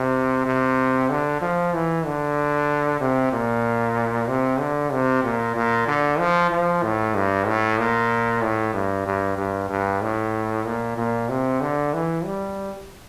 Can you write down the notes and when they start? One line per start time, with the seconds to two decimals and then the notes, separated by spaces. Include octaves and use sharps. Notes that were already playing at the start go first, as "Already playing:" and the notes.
Already playing: C3
0.46 C3
1.10 D3
1.41 F3
1.74 E3
2.06 D3
3.01 C3
3.33 A#2
4.28 C3
4.60 D3
4.92 C3
5.24 A#2
5.56 A#2
5.87 D3
6.19 F3
6.51 F3
6.83 A2
7.15 G2
7.47 A2
7.78 A#2
8.42 A2
8.74 G2
9.06 G2
9.37 G2
9.70 G2
10.02 A2
10.65 A#2
10.98 A#2
11.29 C3
11.61 D3
11.93 E3
12.25 G3